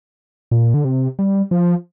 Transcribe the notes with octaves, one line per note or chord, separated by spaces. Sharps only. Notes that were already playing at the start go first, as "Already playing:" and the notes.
A#2
D3
C3
G3
F3